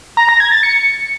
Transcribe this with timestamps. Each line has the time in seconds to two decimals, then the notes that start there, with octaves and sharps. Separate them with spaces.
0.17 A#5
0.29 A#6
0.40 G#6
0.52 A6
0.63 C#7